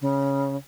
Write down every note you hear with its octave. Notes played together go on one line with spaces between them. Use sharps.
C#3